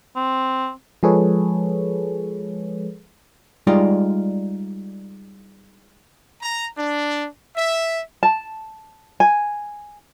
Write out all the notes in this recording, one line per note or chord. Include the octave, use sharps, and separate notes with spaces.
C4
F3 G#3 G#4 A4 B4 C#5
G3 G#3 D#4 F4 D5 D#5
A#5
D4
E5
A5
G#5